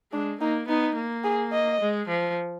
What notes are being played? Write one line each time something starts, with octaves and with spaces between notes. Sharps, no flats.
G#3 D4
A#3 D#4
B3 D#4
A#3
G#4
D#5
G#3
F3